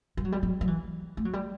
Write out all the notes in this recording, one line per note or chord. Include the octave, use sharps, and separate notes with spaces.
G3
F#3
G3
F#3
F#3
E3
A3
F#3
G3